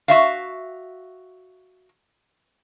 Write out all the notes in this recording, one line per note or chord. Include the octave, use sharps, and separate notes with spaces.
F#4 E5 F5